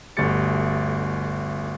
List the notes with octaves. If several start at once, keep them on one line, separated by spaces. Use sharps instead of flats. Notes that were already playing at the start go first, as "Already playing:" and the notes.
G1 D2 A3 G4 A6 C#7